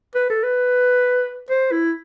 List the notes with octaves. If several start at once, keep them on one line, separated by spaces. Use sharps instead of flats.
B4
A4
B4
C5
E4